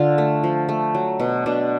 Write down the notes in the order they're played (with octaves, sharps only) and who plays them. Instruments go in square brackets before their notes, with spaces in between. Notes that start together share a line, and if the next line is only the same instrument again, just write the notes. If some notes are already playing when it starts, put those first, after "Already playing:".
Already playing: [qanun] D3 F4
A3
F3
A3
F#3
B2
B2 D4